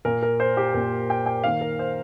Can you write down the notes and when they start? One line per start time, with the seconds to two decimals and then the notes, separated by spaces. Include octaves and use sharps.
0.05 A#2 A#3 A#4
0.23 A#4
0.40 C5
0.57 G4
0.74 A#2 A#3 A#4
1.10 G5
1.26 G5
1.44 D#3 A#3 F5
1.61 A#4
1.79 C5